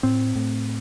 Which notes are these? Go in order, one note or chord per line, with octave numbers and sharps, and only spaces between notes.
A2 C4
A2